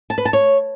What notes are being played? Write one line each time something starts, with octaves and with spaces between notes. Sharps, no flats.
A5
B4
A5
C#5